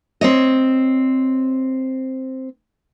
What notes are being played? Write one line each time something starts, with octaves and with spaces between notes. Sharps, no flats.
C4 C#5 D#5